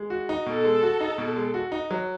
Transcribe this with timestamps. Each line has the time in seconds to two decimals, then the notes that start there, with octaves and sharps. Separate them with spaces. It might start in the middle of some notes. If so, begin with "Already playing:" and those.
Already playing: G#3
0.10 F#4
0.29 D#4
0.46 B2 A4
0.64 G#3
0.82 F#4
1.00 D#4
1.18 B2
1.36 G#3
1.54 F#4
1.72 D#4
1.91 F#3